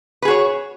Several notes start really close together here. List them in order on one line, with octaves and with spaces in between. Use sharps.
B4 G#4 F#4 C#5